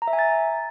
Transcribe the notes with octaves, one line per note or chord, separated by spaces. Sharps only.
A#5
E5
G#5
A6